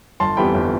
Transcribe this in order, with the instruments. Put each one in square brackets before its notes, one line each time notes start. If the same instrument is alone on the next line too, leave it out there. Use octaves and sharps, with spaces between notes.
[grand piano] G1 A5 C6
F2 E3 G3 B3 G5 B5
G1